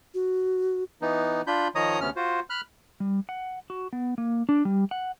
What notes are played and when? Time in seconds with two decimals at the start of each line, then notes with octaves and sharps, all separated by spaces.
0.14 F#4
1.02 E3 B3 D#4
1.47 D4 F4 B5 G6
1.75 D#3 F3 C#5 D#5 A#5 D#6
2.01 D2 C3 B3 C#4 F6
2.16 F4 F#4 C5
2.50 B5 F6 F#6
3.00 G3
3.29 F#5
3.70 F#4
3.93 B3
4.18 A#3
4.49 D4
4.65 G3
4.91 F#5